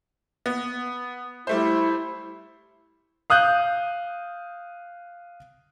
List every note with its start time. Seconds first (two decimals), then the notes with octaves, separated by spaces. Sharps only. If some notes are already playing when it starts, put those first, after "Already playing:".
0.46 B3
1.47 G3 A3 E4 C5
3.30 F5 D#6 F#6 G6